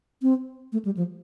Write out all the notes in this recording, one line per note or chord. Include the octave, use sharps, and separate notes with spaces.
C4
A3
G3
F3